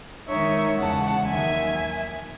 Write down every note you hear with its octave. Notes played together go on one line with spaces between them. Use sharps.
D#3 G#3 D#4 C#5 E5
E2 C#3 G#3 F#5 A5
D#2 D#3 F#3 E5 G#5